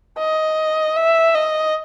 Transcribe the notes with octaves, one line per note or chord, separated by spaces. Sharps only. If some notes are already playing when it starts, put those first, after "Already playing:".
D#5
E5
D#5